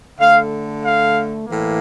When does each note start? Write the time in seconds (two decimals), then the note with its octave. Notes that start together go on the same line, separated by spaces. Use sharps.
0.20 D3 A3 F5
0.83 F5
1.46 A2 E3 A#3